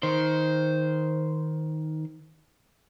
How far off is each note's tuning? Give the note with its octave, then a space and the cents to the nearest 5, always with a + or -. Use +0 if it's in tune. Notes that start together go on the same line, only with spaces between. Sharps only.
D#3 +10 C5 -5